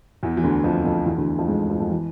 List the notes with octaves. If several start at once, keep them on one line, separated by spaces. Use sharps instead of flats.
E2 E3
E3
D2 D3
F2 F3
F2 F3
E2 E3
D2 D3
F2 F3
G#2 G#3
F2 F3
F2 F3
E3